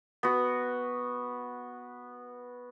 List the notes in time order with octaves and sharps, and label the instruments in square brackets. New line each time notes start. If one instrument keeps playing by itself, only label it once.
[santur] B3 F#4